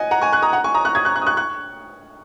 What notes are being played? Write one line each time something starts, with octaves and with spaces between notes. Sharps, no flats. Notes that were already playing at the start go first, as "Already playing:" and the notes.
Already playing: D#5 F#5 G#5
F#5 A#5
G#5 C#6
C#6 F#6
A#5 D#6
F#5 A#5
G#5 C#6
A#5 D#6
C#6 F#6
D#6 G#6
C#6 F#6
C#6 F#6
D#6
C#6 F#6
C#6 F#6